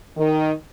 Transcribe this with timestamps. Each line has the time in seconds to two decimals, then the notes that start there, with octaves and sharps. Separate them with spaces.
0.17 D#3